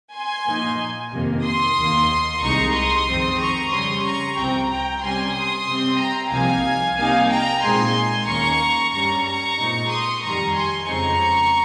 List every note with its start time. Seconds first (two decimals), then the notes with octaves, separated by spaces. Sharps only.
0.14 G#5 C6
0.47 A#2 F3 A#3 D#4
1.12 F2 C3 D#3 A#3
1.44 C6 D#6
1.77 D#2 D#3 A#3
2.41 C2 C3 D#3 G#3 D#4 A#5 C#6
2.75 C6 D#6
3.07 F2 D#3 G#3 C4
3.40 A#5 C#6
3.72 F2 C#3 G3 C#4 C6 D#6
4.04 A#5 C#6
4.36 C2 C3 F3 C4 G5 A#5
4.70 G5 A#5
5.02 C3 G3 C#4 G#5 C6
5.34 C6 D#6
5.68 C3 G3 C4
5.99 G5 A#5
6.32 C2 C3 F3 A#3 D#4 F5 G#5
6.97 C3 G3 A#3 D#4 F5 G#5
7.29 G5 A#5
7.62 A#2 G#3 C4 D#4 G#5 C6
8.27 D#2 D#3 A#3 C#4 A#5 C#6
8.92 G2 G3 C#4 A#5 C#6
9.25 A#5 C#6
9.58 A#2 G#3 C4 D#4
9.90 C6 D#6
10.23 F2 D#3 G3 A#5 C#6
10.55 G#5 C6
10.88 F2 C#3 G#3 C4 D#4 A#5 C#6